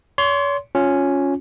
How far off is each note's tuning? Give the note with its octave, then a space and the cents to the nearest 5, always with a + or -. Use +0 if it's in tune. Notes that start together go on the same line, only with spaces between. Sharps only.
C#5 +40 C6 +0
C#4 +0 F4 +20